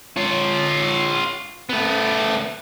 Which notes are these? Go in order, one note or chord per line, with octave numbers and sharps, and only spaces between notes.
F4 C#5
A3 B3